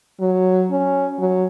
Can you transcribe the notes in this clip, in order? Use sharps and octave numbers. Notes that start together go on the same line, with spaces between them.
F#3
C#4
F#3